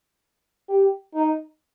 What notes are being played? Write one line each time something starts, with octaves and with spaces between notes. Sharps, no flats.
G4
D#4